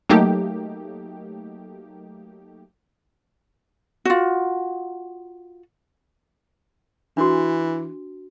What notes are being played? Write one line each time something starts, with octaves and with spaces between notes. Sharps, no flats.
F#3 A3 A#3 D#4 G4
F4 F#4
E3 D4 F#4